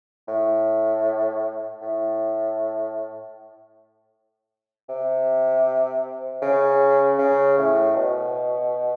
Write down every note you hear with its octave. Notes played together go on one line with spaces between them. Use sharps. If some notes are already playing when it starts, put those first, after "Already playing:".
A2
A2
C3
C#3
C#3
A2
B2